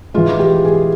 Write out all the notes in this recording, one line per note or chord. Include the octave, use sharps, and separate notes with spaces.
E3 G#3 F4
G4
G#4